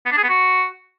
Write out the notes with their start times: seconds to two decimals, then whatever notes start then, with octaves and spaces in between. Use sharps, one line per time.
0.06 B3
0.12 D4
0.18 G#4
0.23 B3
0.29 F#4